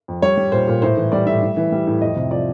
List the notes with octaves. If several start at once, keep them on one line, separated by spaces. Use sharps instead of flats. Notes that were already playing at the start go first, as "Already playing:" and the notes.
F2
G3 C#5
G3
A#2 C5
A#2
A2 C5
E3
G3 D5
A2 E5
A2
E3
G3
A2
F2 D#5
C3
F3 D5